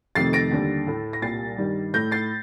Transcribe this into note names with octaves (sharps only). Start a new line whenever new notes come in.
F2 C3 D#3 A3 A6 C7
A#6 D7
D#2 D3 G3
A2 A3
A#6
C2 A#2 G3 A6 C7
G2 D#3 G3
A2 A3 G6 A#6
A6 C7